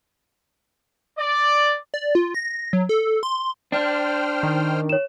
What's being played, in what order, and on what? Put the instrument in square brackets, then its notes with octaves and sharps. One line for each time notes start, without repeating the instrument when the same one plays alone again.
[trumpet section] D5
[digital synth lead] D5
F4
A#6
F#3
A4
C6
[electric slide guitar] D4 [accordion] C5 G5 F6
[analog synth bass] D#3
[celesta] C#5 E7